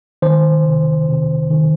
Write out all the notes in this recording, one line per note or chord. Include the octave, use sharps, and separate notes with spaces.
D#3 C5
C3
C3
D#3